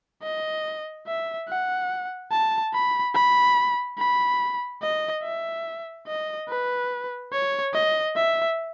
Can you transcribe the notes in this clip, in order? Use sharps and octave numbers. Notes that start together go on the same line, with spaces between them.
D#5
E5
F#5
A5
B5
B5
B5
D#5
E5
D#5
B4
C#5
D#5
E5